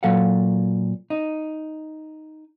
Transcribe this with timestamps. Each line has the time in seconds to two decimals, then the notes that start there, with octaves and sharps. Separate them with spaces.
0.03 A#2 F#3 A4 F5 F#5
1.10 D#4